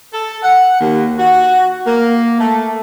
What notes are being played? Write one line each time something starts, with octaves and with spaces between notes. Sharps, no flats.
A4
F#5
D#2
F#4
A#3
A3